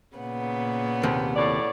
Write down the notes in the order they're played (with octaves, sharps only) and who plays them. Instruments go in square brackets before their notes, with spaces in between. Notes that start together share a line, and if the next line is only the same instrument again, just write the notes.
[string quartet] A#2 C#3 B3
[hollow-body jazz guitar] D#2 C3
[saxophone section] A2 C#5 D5